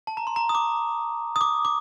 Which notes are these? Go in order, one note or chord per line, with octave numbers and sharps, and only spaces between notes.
A5
A#5
C6
A#5
D#6
D6
D#6
D6
D6